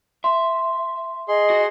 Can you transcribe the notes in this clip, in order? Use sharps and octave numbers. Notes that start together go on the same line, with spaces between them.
E5 C6
G#4 D#5 C6
F#4